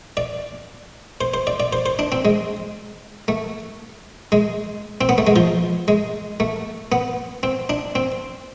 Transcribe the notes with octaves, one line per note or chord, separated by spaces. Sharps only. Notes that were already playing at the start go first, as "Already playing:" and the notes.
D5
C5
C5
D5
D5
C5
C5
D4
C4
G#3
A3
G#3
C4
B3
A3
G#3
F3
G#3
A3
B3
C4
D4
C4